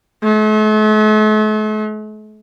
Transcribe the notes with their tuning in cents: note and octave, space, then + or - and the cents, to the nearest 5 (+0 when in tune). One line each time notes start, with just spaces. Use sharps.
A3 -45